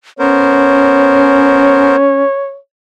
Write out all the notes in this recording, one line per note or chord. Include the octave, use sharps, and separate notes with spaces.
B3 C#4 A#4 C5 C#5